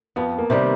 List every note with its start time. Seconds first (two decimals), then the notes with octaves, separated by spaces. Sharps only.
0.16 F2 B3
0.38 A#3
0.50 C3 D#3 G3